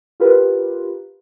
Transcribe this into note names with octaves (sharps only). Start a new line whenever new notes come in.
F4 G4 A#4 B4